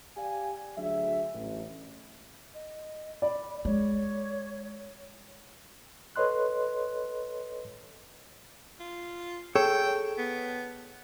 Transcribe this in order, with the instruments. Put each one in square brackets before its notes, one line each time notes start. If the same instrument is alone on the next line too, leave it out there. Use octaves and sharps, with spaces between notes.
[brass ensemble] G4 D5 F5 G#5
D2 F#3 D4 G#4 E5
A1
[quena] D#5
[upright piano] D5 [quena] B5
[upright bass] G#3 [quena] C#5
[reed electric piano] A4 B4 C#5 D#5 C6 F#6
[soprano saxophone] F4
[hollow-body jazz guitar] G#4 A4 C#5 [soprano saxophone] G5
[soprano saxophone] B3